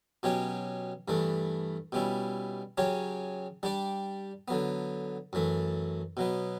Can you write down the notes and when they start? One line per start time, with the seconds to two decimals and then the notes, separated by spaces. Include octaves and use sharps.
0.23 B2 F#3 C#4 G4 C#5
1.08 G2 E3 A3 D4
1.92 B2 G3 C#4 E4
2.78 C#3 F#3 C#4 G4 C#5
3.63 G3 D4 G4 D5
4.48 D3 F#3 B3
5.33 F#2 E3 A3
6.17 B2 F#3 B3